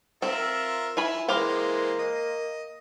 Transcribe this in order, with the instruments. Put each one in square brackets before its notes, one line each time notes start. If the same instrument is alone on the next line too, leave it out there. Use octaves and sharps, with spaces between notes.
[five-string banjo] C4 [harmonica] F4 A#4 E5
[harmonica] E4 [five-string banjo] F4 G#5 B5
[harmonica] E3 G#3 C5 [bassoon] A#3 [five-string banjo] G4 F5 G5
[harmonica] D#5